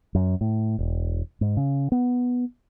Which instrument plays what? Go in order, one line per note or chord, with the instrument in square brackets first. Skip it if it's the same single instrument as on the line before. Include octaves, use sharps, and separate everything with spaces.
[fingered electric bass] F#2
A2
E1
G#2
C#3
B3